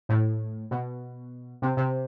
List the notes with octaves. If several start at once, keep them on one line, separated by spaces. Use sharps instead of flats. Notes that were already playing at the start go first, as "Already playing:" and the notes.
A2
B2
C3
C3